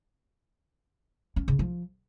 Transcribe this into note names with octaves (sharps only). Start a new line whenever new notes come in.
C#4
C#3
F3